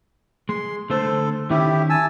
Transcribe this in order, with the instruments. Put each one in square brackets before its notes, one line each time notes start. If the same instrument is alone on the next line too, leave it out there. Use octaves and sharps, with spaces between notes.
[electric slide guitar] G#3 [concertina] C6
[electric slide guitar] D3 A3 C5 [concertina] A4
[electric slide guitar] D#3 C#4 [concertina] E4 G4
[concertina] G#5 A5 E6